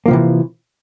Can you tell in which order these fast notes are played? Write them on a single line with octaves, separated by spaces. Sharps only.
A#3 F3 C3 E3